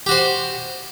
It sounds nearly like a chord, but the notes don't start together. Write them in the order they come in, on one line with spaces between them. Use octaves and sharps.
G4 F#4 C5